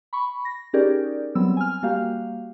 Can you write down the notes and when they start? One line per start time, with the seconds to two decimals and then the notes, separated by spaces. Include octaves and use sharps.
0.13 B5 C#6
0.45 A#6
0.73 C#4 D#4 G4 G#4 A#4 D5
1.35 F#3 G3 B3 C4 E6
1.57 G#5 F6
1.83 G3 A#3 F#4 G4 F5